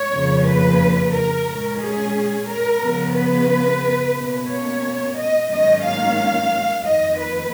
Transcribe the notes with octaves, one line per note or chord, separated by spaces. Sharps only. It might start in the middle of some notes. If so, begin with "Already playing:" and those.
Already playing: C#5
F2 C#3 F3 A#3
B4
A#4
A#2 G#3 C#4
G#4
A#4
C#3 F3 B3
B4
B2 A#3 C#4
C#5
D#5
G#2 D#3 F#3 A#3 C#4 D#5
F5
F2 D#3 A#3 D#5
B4